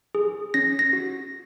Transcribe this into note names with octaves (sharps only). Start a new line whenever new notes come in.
G#4
C#4 A#6
A#6
F#4